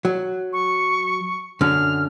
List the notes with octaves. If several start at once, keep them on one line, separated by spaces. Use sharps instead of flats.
F#3
C#6
F#2 D3 F6